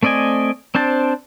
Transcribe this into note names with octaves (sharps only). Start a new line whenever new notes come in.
A3 C4 D5 D#5 G#5
C4 D4 C5 A5